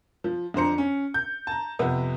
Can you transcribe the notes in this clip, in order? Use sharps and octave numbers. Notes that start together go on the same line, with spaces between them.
F3
F2 D3 D4 C5 A#5 C#7
C#4
G6
A5 A#5
F2 C3 B3